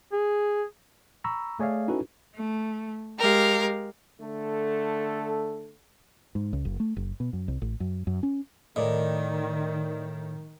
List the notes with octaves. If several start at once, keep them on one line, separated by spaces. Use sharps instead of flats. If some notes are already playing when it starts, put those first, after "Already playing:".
G#4
A#5 B5 C#6 E6
A3 G#4 C#5 D5 E5 F5
C#4 D#4 E4 F#4 A4 B4
A3
G#3 G4 A#4 F5
D3 A3 A4
G#2
C#2
F#1
A3
F#1
B2
F#2
C2
A1
F#2
F#2
C#4
A2 D#3 A#4 D5 D#5